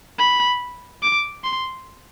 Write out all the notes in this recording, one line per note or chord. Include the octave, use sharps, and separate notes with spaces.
B5
D6
C6